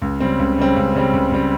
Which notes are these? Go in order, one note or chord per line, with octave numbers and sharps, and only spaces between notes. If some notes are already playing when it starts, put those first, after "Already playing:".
C#2
C#3 G3 C4
C#2
C#3 G3 C4
C#2
C#3 G3 C4
C#2
C#3 G3 C4